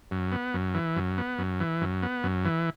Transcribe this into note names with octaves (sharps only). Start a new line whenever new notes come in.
F#2
B3
F#2
E3
F#2
B3
F#2
E3
F#2
B3
F#2
E3